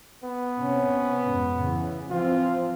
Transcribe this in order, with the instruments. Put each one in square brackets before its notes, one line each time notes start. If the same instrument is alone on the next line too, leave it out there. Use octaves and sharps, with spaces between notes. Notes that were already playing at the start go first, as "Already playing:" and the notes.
[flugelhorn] B3
[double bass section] C3 C#4
F2 G#2
C#3 E3
[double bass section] E3 F3 C4 [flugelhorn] F4